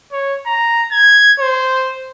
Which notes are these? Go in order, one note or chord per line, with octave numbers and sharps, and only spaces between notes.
C#5
A#5
G#6
C5